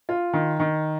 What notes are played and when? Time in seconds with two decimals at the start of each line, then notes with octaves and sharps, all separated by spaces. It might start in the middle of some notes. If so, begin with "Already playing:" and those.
0.09 F4
0.33 D#3
0.60 D#3